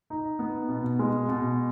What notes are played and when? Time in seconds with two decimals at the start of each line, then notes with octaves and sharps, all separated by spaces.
0.10 D#4
0.39 B3
0.69 B2
0.99 G#3
1.28 B2